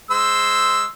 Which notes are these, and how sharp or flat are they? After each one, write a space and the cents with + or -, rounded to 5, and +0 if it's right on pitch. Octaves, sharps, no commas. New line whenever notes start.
G#3 +0 C5 -5 E6 +0